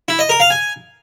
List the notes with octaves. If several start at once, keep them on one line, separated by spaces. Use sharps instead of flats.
E4
D#5
A#4
F5
G#5